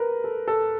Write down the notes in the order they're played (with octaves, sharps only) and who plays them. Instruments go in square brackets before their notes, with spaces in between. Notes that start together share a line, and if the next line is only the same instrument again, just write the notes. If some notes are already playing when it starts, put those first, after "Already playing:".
Already playing: [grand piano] A#4 B4
A4
A4